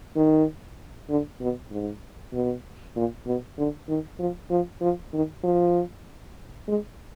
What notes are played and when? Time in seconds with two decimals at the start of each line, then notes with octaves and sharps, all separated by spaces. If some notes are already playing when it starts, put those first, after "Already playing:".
0.16 D#3
1.10 D3
1.41 B2
1.71 G#2
2.33 B2
2.96 A#2
3.26 B2
3.58 D3
3.89 D#3
4.19 F3
4.50 F3
4.81 F3
5.14 D#3
5.44 F3
6.68 G#3